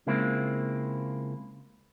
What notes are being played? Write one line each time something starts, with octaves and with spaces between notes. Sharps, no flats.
C#3 G#3 A#3 C4 E4 F4